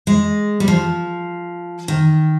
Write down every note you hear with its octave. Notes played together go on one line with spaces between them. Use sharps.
G#3
G3
F3
D#3